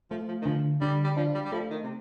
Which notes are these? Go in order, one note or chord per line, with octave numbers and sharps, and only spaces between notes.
F3 A3
F3
D#3
D3 F3
D3 G3
G3
F3 D4
G3
G3
F3 A3
D#3
C3